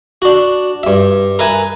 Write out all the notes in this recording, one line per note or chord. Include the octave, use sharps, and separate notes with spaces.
D4 F#4
G2 E5
A#4 B4 E5 G#5